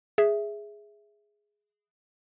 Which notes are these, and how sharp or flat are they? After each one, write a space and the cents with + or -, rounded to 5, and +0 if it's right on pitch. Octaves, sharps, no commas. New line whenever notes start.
G#4 +0 E5 +0